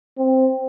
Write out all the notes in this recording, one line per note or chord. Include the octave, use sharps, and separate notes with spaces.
C4